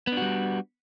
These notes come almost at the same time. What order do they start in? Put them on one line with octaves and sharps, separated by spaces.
B3 D4 F#4 G3